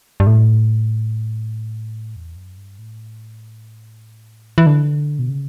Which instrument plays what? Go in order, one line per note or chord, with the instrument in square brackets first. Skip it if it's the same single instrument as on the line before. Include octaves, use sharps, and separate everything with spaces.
[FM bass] G2
A2
E2
F#2
G2
A2
E3
D3
B2
C#3